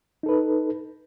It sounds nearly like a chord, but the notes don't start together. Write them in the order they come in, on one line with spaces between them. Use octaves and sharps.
D#4 A4 B4